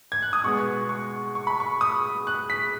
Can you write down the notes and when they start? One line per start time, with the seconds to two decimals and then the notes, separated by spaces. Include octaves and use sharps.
0.12 G#6
0.22 F#6
0.33 D#6
0.44 B2 G#3 B3 C#6
0.89 C#6
1.35 C#6
1.47 B5
1.60 C#6
1.81 D#6
2.27 F#6
2.50 B6